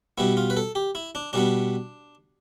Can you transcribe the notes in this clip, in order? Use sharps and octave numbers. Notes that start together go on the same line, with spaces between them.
B2 G3 B3 E4
F4
B4
A4
G4
E4
D4
B2 G3 B3 D4